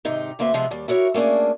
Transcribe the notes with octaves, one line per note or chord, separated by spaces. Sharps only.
G#2 C3 D#3 D#4 G4
D2 A#3 C4 B4 E5
C3 F3 G#3 B3 C4
D#2 G3
E4 F#4 A#4 C#5
A3 A#3 C#4 D4 G#4